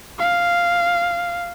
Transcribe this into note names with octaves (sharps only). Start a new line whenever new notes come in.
F5